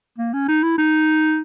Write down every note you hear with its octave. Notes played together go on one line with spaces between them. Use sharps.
A#3
C#4
D#4
E4
D#4